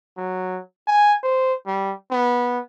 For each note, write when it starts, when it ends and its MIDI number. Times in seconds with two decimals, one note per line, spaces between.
0.17 0.60 54
0.88 1.13 80
1.23 1.53 72
1.66 1.94 55
2.11 2.59 59